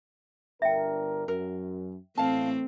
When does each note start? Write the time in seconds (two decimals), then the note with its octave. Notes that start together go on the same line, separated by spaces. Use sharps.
0.62 G1 D4 A#4 E5 G5
1.28 F#2 A#4
2.17 A2 E3 A3 C4 F5 A5